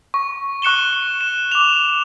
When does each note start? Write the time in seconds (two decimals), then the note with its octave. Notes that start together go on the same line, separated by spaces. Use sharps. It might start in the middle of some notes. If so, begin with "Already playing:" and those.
0.14 C#6
0.62 C#6 F#6 C#7 E7 G7
1.21 E7
1.51 D6 F7